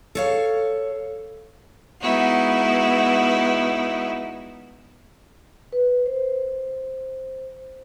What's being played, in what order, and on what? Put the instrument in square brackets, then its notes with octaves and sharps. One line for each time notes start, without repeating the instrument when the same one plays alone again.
[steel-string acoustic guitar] A4 C#5 F5
[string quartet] G#3 B3 D#4 E4 F#4
[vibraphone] B4
C5